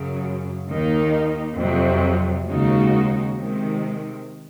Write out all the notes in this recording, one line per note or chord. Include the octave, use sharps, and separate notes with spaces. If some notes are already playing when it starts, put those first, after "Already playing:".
Already playing: F#2 C#3 F#3
D#2 D#3 A#3 D#4
F2 C3 F#3
D#2 C#3 G#3 D#4 F#4
C3 D#3 G#3